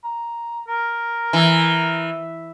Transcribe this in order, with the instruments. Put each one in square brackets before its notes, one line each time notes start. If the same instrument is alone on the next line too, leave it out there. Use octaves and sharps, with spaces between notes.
[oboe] A#5
A#4
[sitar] E3